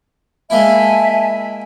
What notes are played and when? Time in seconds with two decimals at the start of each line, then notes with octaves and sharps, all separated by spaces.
0.50 G#3 A#3 E4 E5 G#5 A5